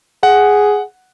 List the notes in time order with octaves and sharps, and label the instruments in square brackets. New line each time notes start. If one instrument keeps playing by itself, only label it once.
[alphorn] G#4 [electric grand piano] F#5